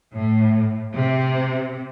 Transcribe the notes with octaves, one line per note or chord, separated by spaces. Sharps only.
A2
C3